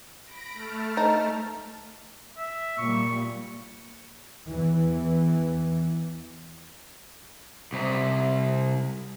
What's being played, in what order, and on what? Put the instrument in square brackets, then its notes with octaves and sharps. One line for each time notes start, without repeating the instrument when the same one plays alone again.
[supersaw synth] B5 A#6 D7
A3 A5 F6
[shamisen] D#4
[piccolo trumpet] E5
[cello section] A#2 G3 [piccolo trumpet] C#6
[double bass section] E2 E3
[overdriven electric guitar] C2 C3